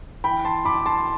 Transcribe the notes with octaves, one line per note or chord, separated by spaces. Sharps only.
E3 G5 B5
A5 C6
A2 B5 D6
A5 C6